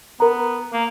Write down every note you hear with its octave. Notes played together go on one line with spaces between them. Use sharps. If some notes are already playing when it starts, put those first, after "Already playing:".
B3 A#4 A#5
A#3